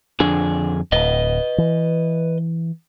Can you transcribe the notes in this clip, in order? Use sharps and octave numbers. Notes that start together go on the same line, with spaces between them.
F2 D3 D4 G#4
D1 B4 D#5
E3